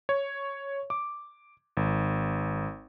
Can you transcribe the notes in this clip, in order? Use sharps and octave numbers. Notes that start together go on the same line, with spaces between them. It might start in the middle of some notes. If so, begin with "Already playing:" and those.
C#5
D6
G#1